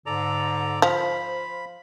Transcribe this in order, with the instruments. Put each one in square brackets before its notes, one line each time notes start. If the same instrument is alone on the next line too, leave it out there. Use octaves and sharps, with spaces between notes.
[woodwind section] G#2 D3 [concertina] A4 D5 A#5
[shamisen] F3 [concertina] B5
[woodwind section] C5 F5